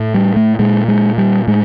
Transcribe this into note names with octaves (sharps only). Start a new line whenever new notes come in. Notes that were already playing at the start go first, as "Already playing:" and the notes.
Already playing: A2
G3
A3
A#2 G#3
G#3
G3
A2 G#3